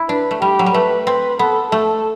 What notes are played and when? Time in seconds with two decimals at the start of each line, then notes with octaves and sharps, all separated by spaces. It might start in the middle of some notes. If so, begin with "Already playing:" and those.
Already playing: E4
0.09 D4 B4
0.31 A3
0.41 G3 G4
0.59 F#3
0.66 G3
0.74 A3 B4
1.06 C4 B4
1.39 B3 A4
1.72 A3 A4